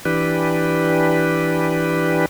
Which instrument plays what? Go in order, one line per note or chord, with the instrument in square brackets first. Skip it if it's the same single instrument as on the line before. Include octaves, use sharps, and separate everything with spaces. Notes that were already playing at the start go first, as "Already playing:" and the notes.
[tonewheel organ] E3 D4 G4 B4